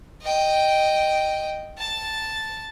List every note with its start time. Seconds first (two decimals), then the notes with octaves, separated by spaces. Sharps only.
0.22 D#5 G5
1.78 A5